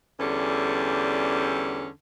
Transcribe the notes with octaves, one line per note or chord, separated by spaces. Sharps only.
E2 D3 G3 C#4 A4